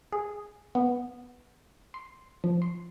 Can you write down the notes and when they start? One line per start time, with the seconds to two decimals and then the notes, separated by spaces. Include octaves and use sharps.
0.12 G#4
0.75 B3
1.94 C6
2.44 F3
2.62 C6